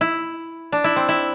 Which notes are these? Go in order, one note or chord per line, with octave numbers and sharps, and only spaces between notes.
E4
D4
E4
C4
E4